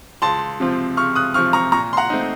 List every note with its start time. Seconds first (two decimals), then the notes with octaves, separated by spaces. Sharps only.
0.22 C#2 A5 C6
0.60 C3 F3 C4 F4
0.97 C#2 C#6 F6
1.15 D#6 F#6
1.34 C3 F3 C4 F4 C#6 F6
1.53 A#5 C#6
1.72 A#2 A#5 C#6
1.93 C6
1.97 F#5 A#5
2.10 A3 C4 D#4